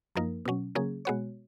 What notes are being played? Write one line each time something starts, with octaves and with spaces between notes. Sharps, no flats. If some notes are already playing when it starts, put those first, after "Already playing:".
F#2 F3 A#3 D#4 A#4
B2 F#3 C#4
C#3 F#3 A#3 C#4 G#4
B2 G#3 B3 F#4 C#5